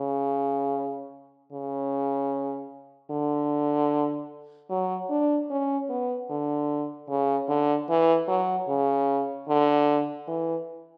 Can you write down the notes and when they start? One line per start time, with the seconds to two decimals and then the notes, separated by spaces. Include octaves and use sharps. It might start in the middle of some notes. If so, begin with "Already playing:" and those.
Already playing: C#3
1.52 C#3
3.10 D3
4.70 F#3
5.10 D4
5.50 C#4
5.89 B3
6.30 D3
7.09 C#3
7.49 D3
7.89 E3
8.28 F#3
8.68 C#3
9.48 D3
10.28 E3